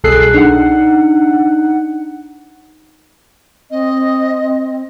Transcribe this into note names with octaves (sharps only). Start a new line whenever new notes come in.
C2 B2 G#4 A4 F#6 C7
D4 D#4 F#5
C4 D#5